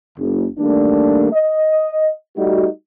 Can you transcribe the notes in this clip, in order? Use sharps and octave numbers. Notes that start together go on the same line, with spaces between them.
F#1
D#3 G3 A3 A#3 D4
D#5
G3 A3 D#4 F#4